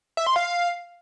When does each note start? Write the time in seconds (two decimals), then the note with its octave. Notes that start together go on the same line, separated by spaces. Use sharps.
0.17 E5
0.27 C6
0.36 F5